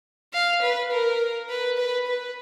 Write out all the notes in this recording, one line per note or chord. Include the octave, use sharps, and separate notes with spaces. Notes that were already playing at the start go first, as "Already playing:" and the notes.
F5
B4
A#4
B4
B4
B4